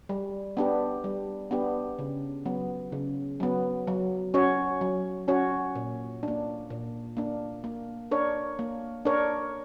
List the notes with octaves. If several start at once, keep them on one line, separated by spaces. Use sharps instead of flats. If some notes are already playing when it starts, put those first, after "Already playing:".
G3
B3 D4 G4
G3
B3 D4 G4
C#3
F#3 B3
C#3
F#3 B3
F#3
C#4 F#4 C#5
F#3
C#4 F#4 C#5
A#2
A#3 D4
A#2
A#3 D4
A#3
D4 A#4 C#5
A#3
D4 A#4 C#5